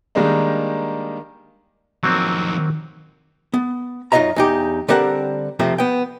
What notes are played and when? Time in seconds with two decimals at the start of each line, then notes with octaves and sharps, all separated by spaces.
0.15 D#3 G3 G#3 A#3 D4 D#4
2.03 F2 D#3 F#3 A#3 C4
3.54 B3
4.12 F#2 D#4 F4 D#5 E5 A#5
4.36 E2 D#4 G4
4.88 D3 G3 C4 A4 A#4 F#5
5.59 F2 C3 F3 A3 C4
5.78 B3 G5